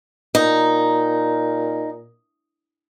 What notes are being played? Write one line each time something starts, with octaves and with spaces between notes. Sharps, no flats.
A#2 D#4